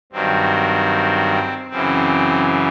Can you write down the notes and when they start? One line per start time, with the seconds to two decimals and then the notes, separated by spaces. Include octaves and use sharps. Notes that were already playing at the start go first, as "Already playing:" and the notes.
0.12 G2 D#3 F#3 C4
1.70 F#2 C#3 E3 C4